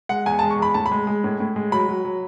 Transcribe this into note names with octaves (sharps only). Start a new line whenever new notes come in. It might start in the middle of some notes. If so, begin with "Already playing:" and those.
G#3 F#5
E2 G#5
G#3 A5
C#6
E2 B5
A2 A5
B5
G#3
G#3
A2
A2
G#3
F#3 B5
F#3
F#3